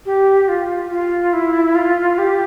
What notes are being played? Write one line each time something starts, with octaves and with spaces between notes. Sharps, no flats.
G4
F4
F4
E4
F4
G4